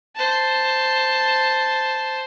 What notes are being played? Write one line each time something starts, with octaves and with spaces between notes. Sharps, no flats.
C5 A5